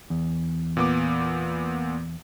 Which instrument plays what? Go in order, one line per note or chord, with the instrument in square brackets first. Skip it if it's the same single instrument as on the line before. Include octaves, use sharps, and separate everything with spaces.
[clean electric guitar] E2
[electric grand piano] A#2 B3 D6